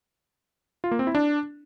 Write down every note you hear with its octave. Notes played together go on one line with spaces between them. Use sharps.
F4
A#3
C4
E4
D4